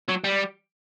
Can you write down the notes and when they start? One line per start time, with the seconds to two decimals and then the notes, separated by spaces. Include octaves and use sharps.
0.09 F#3
0.24 G3